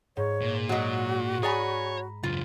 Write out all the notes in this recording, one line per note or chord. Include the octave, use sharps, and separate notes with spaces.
G#2 C#5
A#2
F#3 G#3 F#4
G#4 C#5 D5 G#5 A#5 B5
C#2 F#2 F4